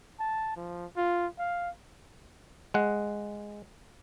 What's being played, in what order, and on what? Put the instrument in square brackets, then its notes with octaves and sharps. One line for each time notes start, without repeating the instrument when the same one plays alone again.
[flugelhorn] A5
F3
F4
F5
[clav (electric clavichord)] G#3 F#5